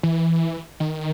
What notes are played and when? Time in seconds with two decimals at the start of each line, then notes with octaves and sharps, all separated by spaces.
0.03 E3
0.80 D#3